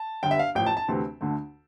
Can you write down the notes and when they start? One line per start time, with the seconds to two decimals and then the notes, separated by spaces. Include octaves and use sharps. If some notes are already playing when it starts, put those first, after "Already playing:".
Already playing: A5
0.23 G1 G2 D3 G3 G5
0.31 E5
0.39 F5
0.55 A1 A2 F3 G5
0.66 A5
0.77 A5
0.88 D2 C3 E3 A3 C4
1.21 D2 D3 A3